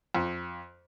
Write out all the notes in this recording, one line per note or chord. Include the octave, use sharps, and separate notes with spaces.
F2